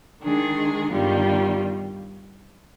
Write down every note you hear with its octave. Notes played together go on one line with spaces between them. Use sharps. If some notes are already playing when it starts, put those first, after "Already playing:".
D#3 G#3 D4 G#4
G2 D#3 G3 B3 F4